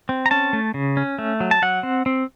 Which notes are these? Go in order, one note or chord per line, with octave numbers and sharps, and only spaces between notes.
C4
A#5
C#4 A5
A3
C#3
C#4
A3
F#3
A5
F#3 F#5
C4
C4